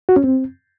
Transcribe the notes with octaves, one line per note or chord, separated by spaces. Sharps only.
F#4
C#4
C4